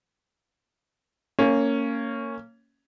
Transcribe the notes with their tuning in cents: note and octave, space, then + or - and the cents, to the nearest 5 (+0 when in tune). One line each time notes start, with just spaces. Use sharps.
A#3 -20 C#4 +0